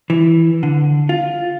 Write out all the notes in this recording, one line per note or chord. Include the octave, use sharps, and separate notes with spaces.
E3
D3
F4